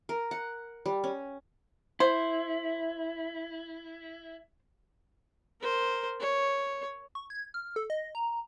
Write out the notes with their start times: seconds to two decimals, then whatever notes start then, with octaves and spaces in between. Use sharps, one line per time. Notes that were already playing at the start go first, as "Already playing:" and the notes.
0.09 A#4
0.31 F#5
0.86 G3
1.04 C#4
2.00 E4 C5
5.60 A#4 C5
6.20 C#5
7.15 C#6
7.30 G#6
7.54 F6
7.76 A4
7.90 D#5
8.15 A#5